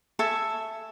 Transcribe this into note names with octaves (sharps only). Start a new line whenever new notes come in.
A4 E5 G#5 C#6